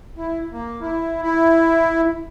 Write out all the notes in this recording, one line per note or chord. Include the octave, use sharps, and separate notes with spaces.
E4
A#3
E4
E4